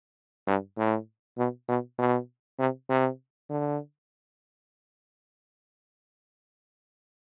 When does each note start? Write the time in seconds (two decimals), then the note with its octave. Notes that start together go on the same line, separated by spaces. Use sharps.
0.47 G2
0.77 A2
1.38 B2
1.68 B2
1.98 B2
2.59 C3
2.89 C3
3.50 D3